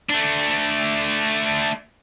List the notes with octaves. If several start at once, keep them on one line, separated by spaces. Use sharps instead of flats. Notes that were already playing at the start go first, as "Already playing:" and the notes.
A3 D4